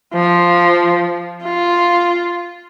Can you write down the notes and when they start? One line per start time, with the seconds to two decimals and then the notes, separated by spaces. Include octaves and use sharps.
0.14 F3
1.43 F4